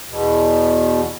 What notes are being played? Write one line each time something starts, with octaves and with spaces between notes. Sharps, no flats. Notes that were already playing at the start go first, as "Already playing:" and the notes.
E2 B2